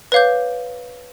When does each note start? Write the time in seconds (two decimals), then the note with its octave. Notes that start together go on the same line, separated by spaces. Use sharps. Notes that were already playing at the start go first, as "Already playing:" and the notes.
0.12 B4 C#5 F5 D6 G6